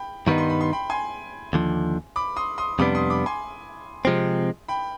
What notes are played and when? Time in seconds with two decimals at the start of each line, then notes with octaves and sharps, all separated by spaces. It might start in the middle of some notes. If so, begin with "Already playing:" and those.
Already playing: G5 B5
0.27 G2 D#3 G3 B3 D#4 B5
0.38 C6
0.50 B5
0.61 C6
0.73 G5 B5
0.90 G#5 C6
1.53 D#2 D3 F3
2.16 B5 D6
2.36 C6 D#6
2.58 C6 D#6
2.79 F2 C3 G3 B3 D4 B5 D6
2.95 C6 D#6
3.10 B5 D6
3.26 G#5 C6
4.05 C3 F3 G#3 C4
4.68 G5 B5